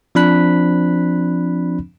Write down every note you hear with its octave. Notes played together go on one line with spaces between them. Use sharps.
F3 C4 D4 B5 F#6 B6